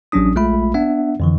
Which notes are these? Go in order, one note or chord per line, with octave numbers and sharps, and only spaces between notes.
A1 F#3 C#4 D4 D#6
A#1 G#3 A3 F4 E5 B5
B3 D4 E5 F#5
F2 D3 E3